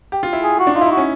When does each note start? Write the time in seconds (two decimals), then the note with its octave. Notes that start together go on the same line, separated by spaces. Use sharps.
0.12 G4
0.23 F4
0.33 E4
0.44 G#4
0.59 F#4
0.67 D4
0.75 D#4 F4
0.81 E4
0.86 D#4
0.91 F#4
0.97 C#4